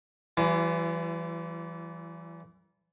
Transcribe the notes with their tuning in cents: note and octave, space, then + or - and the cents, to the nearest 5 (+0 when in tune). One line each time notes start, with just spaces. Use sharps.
E3 +25 G3 -30 E4 +45